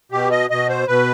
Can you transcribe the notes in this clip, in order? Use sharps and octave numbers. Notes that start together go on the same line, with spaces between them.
B2 G4
D#5
B2 D#5
C5
B2 B4